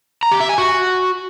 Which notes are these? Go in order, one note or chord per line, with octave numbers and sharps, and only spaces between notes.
A#5
G4
E5
G#5
F#4